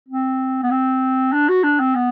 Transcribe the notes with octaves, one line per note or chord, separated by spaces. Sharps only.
C4
B3
C4
D4
F#4
D4
C4
B3